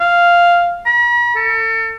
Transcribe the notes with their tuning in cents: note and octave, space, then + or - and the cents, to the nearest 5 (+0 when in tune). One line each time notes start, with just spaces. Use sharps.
F5 -5
B5 -45
A4 +35